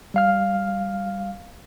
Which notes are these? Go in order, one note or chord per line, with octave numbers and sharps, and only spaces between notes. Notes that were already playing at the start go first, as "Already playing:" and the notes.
G3 F5 F6